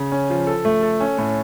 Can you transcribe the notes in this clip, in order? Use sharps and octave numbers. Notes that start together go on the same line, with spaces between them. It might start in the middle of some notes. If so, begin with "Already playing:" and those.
Already playing: C#3
C#4
F3
A4
A3
A4
C#4
A2